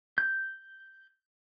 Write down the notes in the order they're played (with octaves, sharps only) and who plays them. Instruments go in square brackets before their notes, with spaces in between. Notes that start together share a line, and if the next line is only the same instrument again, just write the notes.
[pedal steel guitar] G6